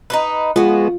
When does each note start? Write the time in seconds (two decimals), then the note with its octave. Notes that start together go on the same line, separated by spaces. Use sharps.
0.10 D#4 F#4 B4
0.56 G#3 B3 F4 F#4